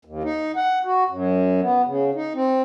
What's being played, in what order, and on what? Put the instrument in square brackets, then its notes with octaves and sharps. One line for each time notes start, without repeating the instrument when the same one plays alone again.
[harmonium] D#2
D#4
F#5
F#4
F#2
B3
C#3
D#4
C4